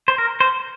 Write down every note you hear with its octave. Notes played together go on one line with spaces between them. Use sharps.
C5
A#4
C5